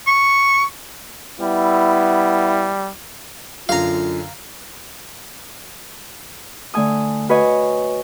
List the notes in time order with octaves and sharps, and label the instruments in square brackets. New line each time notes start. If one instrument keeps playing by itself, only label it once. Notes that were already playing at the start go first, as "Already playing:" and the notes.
[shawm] C#6
[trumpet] G3 [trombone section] B3 E4
[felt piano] F#2 D3 [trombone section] F4 [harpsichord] F5 A#5
[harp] D3 A3 G#5 D#6
F#4 B4 C#5 D#5 G#5